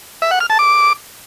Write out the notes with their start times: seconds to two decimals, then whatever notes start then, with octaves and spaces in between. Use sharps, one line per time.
0.22 E5
0.31 F#5
0.40 F6
0.50 A5
0.59 D6